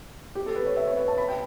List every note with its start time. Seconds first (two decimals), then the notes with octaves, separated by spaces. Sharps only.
0.35 G4
0.46 A4
0.56 B4
0.66 C#5
0.77 E5
0.87 C#5
0.97 B4
1.08 A5
1.18 B5
1.28 G5